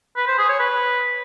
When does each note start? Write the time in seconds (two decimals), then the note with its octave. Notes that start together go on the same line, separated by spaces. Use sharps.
0.17 B4
0.27 C5
0.38 G#4
0.49 C#5
0.60 B4